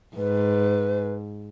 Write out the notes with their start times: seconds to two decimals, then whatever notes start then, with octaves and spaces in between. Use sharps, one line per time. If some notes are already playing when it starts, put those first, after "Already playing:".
0.16 G#2 B4